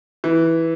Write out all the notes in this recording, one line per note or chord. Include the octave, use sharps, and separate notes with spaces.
E3